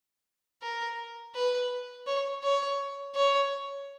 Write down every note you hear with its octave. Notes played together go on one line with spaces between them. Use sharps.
A#4
B4
C#5
C#5
C#5